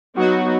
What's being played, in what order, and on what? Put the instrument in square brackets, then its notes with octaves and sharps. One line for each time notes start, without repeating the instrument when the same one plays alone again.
[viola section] F#3 B3 D#4 [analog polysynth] F#4